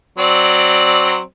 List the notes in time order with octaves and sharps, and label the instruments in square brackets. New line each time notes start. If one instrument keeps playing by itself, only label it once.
[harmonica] F#3 C4 D5